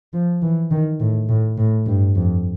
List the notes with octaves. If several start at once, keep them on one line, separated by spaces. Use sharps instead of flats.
F3
E3
D#3
A2
A2
A2
G2
F2